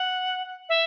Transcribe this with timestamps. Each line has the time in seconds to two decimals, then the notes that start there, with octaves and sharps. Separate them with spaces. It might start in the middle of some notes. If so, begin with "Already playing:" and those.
Already playing: F#5
0.69 E5